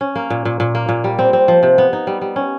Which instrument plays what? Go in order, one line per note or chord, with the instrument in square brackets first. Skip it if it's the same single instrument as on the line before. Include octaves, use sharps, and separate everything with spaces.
[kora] C#4
A#3
A#2
A#2
A#2
A#3
A#2
G3
C4
C4
F3
C3
B3
D#4
G3
G3
C#4